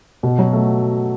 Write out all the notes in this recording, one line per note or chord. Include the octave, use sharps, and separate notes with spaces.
B2
F#3
A3